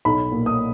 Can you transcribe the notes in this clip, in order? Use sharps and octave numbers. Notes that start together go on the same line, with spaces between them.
B1 B5
A#2
D#6